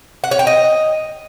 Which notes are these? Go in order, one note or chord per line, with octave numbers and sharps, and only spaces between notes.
F#5
C#5
G5
D#5